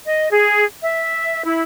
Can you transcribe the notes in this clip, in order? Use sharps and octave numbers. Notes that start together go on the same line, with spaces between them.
D#5
G#4
E5
E4